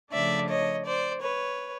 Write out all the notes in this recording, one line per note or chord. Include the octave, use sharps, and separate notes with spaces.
C#3 F3 A3 D4 D5 E5
C#5 D#5
C5 D5
B4 C#5